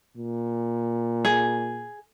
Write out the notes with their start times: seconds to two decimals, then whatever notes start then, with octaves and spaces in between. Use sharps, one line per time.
0.16 A#2
1.25 G#4